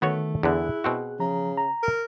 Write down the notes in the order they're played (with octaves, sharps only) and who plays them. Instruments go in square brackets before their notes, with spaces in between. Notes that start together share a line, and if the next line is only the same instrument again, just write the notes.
[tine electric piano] D#3 [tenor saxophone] A3 [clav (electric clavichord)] B3 F#4 C#5
[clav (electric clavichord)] E2 D3 [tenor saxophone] E4 [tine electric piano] G#4 F#6
[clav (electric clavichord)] B2 C4 F#4
[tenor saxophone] C#3 [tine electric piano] F3 A#5
[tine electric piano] A#5
[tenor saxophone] A#4